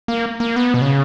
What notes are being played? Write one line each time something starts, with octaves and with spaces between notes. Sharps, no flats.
A#3
A#3
B3
B2
C#3